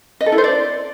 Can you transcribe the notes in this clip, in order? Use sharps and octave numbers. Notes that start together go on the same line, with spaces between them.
D#5
A4
E4
C5
D5